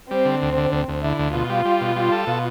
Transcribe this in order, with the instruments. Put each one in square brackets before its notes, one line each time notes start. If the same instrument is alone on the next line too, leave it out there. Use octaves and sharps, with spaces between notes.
[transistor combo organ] G3 [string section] C4
[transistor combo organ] D3
D2
D3
[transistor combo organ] D2 [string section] C4
[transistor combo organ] D2
[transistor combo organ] D3 [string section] E4
[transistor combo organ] D2
[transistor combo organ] B2 [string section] F4
[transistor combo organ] G3
G3
B2
G3
A4
B2